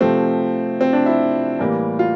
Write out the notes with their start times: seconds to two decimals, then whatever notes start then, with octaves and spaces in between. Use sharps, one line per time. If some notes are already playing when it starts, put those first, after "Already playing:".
0.01 C3 F3 A3 C4
0.81 C4
0.93 D4
1.06 E4
1.59 A2 E3 G3 A#3
1.99 F4